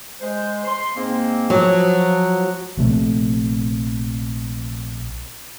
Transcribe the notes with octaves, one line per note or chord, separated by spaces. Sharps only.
G#3 C5
C6
G#2 A#3 C4
F3 F#3
A#1 C3 A3 C4